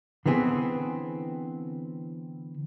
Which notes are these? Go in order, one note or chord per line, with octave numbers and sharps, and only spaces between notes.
D3 E3 B3 C4 G#4